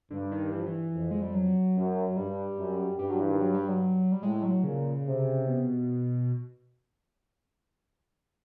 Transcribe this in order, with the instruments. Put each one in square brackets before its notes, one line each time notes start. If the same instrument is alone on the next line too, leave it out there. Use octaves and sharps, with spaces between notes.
[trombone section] G2 [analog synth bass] D3
[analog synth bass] D#3
E3
F3
E3
[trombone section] F2
[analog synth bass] G#3
G3
F#3
[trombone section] F#2
[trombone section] G2 [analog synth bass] G3
[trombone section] F#2
[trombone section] G2 [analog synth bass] G3
[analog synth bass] F#3
E3
D#3
F#3
G3
F#3
G3
[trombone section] A2 [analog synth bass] G#3
[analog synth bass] F#3
[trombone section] A#2 [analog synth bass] C#3
[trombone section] C3
[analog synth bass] B2